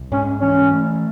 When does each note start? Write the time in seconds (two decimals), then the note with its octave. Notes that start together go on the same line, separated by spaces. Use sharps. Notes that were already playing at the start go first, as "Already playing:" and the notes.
Already playing: C2
0.11 G#2 C#4
0.41 E3 C#4
0.73 A3